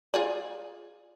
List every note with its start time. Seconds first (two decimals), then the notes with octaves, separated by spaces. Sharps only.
0.14 F4 G#4 D5